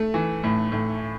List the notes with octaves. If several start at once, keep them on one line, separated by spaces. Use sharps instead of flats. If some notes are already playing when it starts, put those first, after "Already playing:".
Already playing: A3
E3
A2
A2